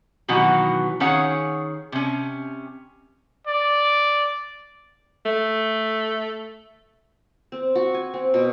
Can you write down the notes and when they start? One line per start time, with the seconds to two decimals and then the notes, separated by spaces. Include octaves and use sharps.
0.28 B2 D#3 E3 F#3 B3 F#4
1.00 D#3 C#4 G#4 C#5 F5 F#5
1.92 C3 C#4
3.47 D5
5.25 A3
7.52 C4
7.75 F#4
7.94 G#5
8.14 C4
8.34 B2